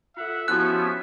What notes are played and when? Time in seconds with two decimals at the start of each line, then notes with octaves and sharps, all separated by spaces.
0.17 F4 A4 E5 F#5
0.48 F3 B3 C#4 E4 F#4 G4 F#6